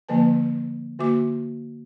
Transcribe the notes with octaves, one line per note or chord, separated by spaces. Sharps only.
D3 F3 A#3 B4 A5
D3 A#3 F#4 E5 D6